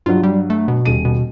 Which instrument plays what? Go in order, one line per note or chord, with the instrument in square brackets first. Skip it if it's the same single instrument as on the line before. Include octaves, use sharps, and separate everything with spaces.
[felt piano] G2 F#3 [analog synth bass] F4
[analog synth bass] G3
A3
B2
[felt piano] D#1 D#7
[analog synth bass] B2